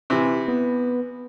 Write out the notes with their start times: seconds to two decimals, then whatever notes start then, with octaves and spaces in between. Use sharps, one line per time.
0.10 C3 E3
0.48 B3